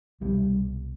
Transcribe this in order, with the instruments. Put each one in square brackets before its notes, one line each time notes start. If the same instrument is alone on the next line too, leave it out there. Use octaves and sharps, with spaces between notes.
[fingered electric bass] C2 B2 G3